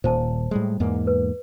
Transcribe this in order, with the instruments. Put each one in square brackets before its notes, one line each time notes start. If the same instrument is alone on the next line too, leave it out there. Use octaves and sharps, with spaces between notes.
[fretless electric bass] D#1 A#2 [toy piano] C5 A5
[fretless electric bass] A2 G3 G#3
E2 G#2 A#3
[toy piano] B4